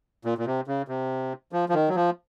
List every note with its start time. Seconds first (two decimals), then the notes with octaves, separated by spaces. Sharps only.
0.25 A#2
0.38 A#2
0.46 C3
0.67 C#3
0.88 C3
1.52 F3
1.69 F3
1.74 D#3
1.88 F#3
1.95 F3